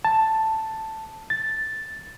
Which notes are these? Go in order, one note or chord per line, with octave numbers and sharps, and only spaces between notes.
A5
A6